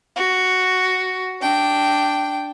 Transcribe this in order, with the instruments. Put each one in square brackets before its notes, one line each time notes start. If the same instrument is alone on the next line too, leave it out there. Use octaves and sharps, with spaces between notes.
[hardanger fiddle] F#4
D4 G5